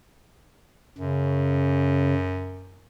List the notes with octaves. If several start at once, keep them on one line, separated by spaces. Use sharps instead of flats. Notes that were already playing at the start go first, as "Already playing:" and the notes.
F#2 C#3